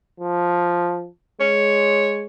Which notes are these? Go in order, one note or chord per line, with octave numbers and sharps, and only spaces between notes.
F3
G#3 C#5